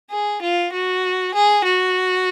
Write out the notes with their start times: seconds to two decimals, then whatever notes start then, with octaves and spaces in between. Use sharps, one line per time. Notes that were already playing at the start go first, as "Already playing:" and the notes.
0.11 G#4
0.42 F4
0.73 F#4
1.34 G#4
1.65 F#4